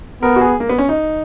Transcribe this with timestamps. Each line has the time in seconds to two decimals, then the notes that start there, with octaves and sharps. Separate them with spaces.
0.22 B3 A#4
0.36 F#4
0.41 G#4
0.60 A#3
0.69 B3
0.78 C#4
0.89 D#4